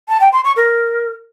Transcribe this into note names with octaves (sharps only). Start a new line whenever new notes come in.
A5
G5
C6
C#6
A#4